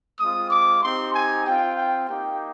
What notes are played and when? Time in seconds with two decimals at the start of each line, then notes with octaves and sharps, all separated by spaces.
0.19 G#3 C4 F4 D#6
0.50 D6
0.82 C4 D#4 G4 C6
1.13 G#5
1.46 C4 F4 G5
1.77 G5
2.08 A#3 D#4 G4 G5